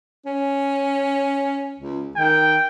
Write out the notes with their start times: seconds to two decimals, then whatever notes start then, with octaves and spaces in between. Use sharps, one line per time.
0.26 C#4
1.79 C#2
2.16 D#3 G5